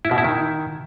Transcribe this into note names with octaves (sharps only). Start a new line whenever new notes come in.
E4
B2
E4
D#3